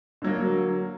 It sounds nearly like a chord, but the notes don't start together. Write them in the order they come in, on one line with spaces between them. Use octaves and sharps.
D3 F#3 A#3